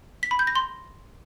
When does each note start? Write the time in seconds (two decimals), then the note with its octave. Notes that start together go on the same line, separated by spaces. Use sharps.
0.23 B6
0.31 B5
0.39 G6
0.47 A#6
0.55 C6